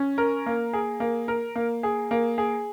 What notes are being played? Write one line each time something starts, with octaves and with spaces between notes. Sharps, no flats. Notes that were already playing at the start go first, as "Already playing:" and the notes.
Already playing: C#4
A#4
A#3
G#4
A#3
A#4
A#3
G#4
A#3
G#4